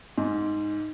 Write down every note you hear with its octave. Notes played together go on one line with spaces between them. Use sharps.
G#2